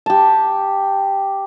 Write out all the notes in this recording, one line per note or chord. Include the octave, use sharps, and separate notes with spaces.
G4 A5